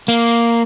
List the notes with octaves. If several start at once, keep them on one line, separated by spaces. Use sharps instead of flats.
A#3